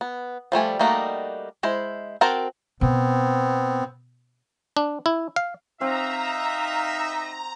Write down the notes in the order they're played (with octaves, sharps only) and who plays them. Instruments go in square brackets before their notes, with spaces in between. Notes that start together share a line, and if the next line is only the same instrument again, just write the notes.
[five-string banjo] B3
F3 G3 A3 G#5
G3 A3 A#3 D#4 F#4
G#3 E4 C5
C4 F#4 A#4 C5 A5
[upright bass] B2 [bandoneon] B3 C4
[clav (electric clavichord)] D4
E4
F5
[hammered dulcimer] C4 F#4 [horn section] D#4 E5 [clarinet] F5 [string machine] A#5